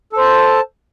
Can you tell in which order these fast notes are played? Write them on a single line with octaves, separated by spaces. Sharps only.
A4 C5 A5